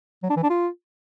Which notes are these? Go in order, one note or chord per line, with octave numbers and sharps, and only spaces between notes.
F#3
D4
E3
D4
F4